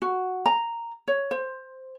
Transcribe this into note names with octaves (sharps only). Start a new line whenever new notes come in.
F#4
A#5
C#5
C5